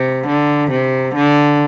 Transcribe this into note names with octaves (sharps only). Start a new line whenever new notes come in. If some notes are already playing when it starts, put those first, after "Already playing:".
Already playing: C3
D3
C3
D3